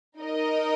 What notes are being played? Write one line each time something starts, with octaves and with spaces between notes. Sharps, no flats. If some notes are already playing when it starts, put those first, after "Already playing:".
D#4 A#4 D#5